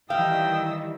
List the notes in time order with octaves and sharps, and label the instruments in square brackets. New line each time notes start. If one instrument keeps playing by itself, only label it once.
[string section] D#3 E3 G3 [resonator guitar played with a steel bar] F5 [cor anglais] G5 [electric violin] D#6 E6